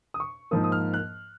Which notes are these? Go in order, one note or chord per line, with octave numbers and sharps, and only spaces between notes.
D#6
C#6
G#2 F3 A#3 D#6
D#6
F6
F#6